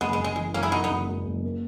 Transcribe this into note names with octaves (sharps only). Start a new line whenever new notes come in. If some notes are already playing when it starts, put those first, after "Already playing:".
F#1 G#3 B3
G#3
F#1
G#3
E3 G#3
F#2 A#3 C#4
E4 G#4
F#2 D#4 F#4
B3 D#4
F#1
F#2
F#1
A#3